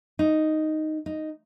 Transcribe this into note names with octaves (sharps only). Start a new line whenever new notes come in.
D#4
D#4